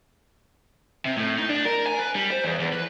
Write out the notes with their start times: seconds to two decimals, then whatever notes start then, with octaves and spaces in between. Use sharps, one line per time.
1.05 C3
1.17 A2
1.38 D#4
1.50 D4
1.65 A#4
1.86 G#5
1.99 B4
2.15 G3
2.30 C5
2.43 E2
2.60 E2
2.73 B4